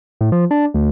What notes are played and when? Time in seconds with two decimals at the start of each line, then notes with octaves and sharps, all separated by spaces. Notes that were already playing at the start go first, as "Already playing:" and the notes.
0.21 A2
0.32 F3
0.51 D4
0.74 D2